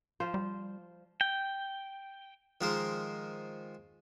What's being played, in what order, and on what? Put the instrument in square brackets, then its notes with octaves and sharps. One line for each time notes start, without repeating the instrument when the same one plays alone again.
[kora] F3 C5
[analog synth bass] G3
[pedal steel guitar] G5
[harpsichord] D#3 F3 G#3 A#4 C5